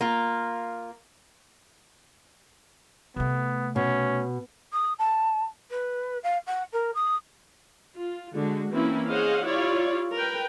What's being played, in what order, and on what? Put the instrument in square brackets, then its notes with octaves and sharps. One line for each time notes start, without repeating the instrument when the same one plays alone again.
[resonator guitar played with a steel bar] A#3 F4
[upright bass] C3 A3 [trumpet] B3
[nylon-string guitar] B2 [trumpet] C#4
[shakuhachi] D#6
A5
B4
F5
F#5
A#4
D#6
[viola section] F4
D3 G#3 F#4
E3 A#3 C4 C#4 E4
G#4 C5 C#5 D#5 F5 F#5
E4 F4 G4 C#5 D5 F5
A#4 B4 G5